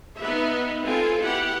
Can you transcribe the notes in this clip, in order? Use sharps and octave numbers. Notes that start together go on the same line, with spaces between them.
B3 D#4 B4 E5
C4 F4 A4 G#5
B3 E4 G4 F#5